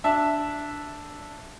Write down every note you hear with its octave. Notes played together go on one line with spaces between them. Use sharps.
D4 E5 A5